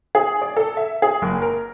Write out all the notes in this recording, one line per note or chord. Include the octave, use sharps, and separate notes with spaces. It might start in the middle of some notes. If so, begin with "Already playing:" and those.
G#4
D5
A4
E5
G#4
F#1
A#4